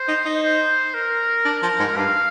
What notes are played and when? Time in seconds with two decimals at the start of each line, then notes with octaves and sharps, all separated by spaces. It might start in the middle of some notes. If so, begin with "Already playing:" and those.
Already playing: C5
0.08 D#4
0.25 D#4
0.43 C5
0.94 A#4
1.45 D4
1.62 F3
1.79 G#2
1.96 G2 F5